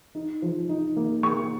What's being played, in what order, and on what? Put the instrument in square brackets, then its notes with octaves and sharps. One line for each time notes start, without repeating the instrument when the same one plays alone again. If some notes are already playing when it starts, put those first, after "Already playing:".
[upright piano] D#4
F3
D#4
A#3
A#3 C#6